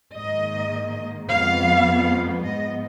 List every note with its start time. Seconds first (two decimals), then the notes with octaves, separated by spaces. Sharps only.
0.17 G#2 D#3 A#3 D#5
1.31 F2 F3 G#3 B3 F5
2.46 G#2 F3 B3 D#5